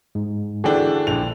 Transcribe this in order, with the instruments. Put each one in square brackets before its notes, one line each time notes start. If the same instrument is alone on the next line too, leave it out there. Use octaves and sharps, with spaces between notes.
[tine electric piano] G#2 G#3
[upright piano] D3 E3 D4 [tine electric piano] F#4 [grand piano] G#4 G5
[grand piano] A#1 F7 [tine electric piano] G5